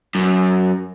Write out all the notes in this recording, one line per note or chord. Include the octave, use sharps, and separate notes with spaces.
F#2